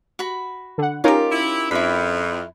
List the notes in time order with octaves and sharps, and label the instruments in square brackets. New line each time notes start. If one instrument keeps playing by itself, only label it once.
[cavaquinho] F#4 B5
[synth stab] D3 F#5
[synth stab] C#4 D#4 A#4 [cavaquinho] F4 G4
[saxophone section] E4
[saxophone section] F2 [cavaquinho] E4 B5